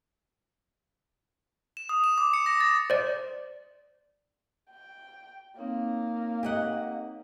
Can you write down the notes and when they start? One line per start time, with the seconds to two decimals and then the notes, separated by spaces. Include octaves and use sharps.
1.77 E7
1.89 D#6
2.04 E7
2.18 D6
2.34 C#7
2.46 A#6
2.61 A6
2.90 C5 D5
4.70 G5
5.57 A#3 C4 D#4 C#5
6.43 G4 D#5 F#5